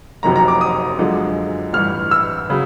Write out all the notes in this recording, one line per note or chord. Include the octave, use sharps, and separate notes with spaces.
F#1 F2 C3 D#3 F#3 A#5
A#5
D6
D#6
F#2 D3 F3 G#3
A1 G2 E3 F6
E6
C#3 F#3